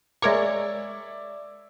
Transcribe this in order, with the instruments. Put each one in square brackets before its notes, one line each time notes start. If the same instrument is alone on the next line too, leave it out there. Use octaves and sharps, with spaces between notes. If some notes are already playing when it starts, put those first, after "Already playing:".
[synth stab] G#3 A#4 C#5 [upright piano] D5 E5 D6